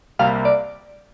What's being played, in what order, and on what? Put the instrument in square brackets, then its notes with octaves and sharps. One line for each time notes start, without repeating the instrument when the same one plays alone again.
[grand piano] C2 C3 G3 A#3 [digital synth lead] F5
[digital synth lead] D5